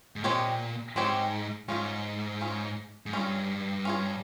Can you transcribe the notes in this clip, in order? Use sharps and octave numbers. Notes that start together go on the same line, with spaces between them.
G#2
A#2 G#3 C4 G4 C#5
G#2 G#3 C4 G4 C#5
G#2 C#4 F4 G#4
C#4 F4 G#4
G#2
G2 C#4 F4 G#4
C#4 F4 G#4